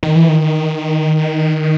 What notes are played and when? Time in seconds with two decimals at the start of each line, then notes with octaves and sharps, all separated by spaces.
0.03 D#3
0.15 E3
0.29 D#3